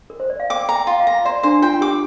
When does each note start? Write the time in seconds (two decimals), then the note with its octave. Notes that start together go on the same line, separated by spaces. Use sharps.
0.10 A#4
0.20 C5
0.30 D5
0.40 F5
0.50 G5 D6
0.69 A#5
0.75 G5
0.87 F4
1.00 F5
1.07 A#5
1.25 C5 D5
1.43 D4 C5
1.62 F4 G5
1.81 G4 D6